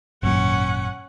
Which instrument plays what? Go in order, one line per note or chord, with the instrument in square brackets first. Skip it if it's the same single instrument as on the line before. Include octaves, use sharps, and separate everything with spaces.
[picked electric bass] G#1 F#2 A#2 [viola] C#4 F#5